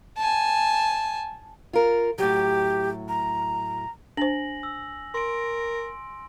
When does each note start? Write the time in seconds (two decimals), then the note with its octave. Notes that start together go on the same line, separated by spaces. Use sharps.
0.17 G#5 A5
1.73 F4 A#4
2.18 A2 F#3 G4
3.09 A#5
4.17 D4 C5 G#5 A#6 F#7
4.63 E6
5.14 A#4 C6 D7